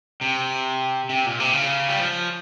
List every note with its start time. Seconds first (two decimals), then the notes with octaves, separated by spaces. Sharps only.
0.21 C3
1.09 C3
1.26 A#2
1.40 C3
1.53 C#3
1.89 G3
1.98 F3